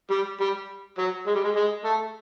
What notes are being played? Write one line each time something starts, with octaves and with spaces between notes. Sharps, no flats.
G3
G3
F#3
G#3
G3
G#3
G#3
A3